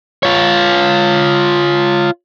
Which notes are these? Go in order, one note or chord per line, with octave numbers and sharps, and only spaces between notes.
F4 C#5